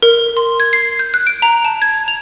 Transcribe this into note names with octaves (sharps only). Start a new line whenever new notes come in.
A#4
C6
G#6
C7
G6
F#6
D7
A#5
A5
G#6
F7